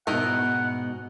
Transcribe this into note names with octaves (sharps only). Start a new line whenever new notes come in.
G#2 B2 D#4 E4 A#4 F#5